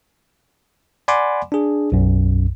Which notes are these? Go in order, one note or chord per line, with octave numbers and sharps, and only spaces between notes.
D5 F#5 G#5 B5 C6 D6
D4 G#4
B1 F#2